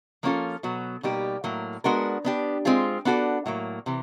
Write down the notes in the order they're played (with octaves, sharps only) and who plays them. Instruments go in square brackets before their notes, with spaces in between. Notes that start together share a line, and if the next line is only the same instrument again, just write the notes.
[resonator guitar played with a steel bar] F3 A#3 C#4 F4 A4
B2 F#3 B3
B2 G3 A#3 D#4 G4
A2 F#3 A#3
G#3 B3 D4 F#4 A#4
B3 D4 G4
G#3 C4 F4 G#4
B3 D4 F#4 A4 D5
A2 F#3 A#3
C3 E3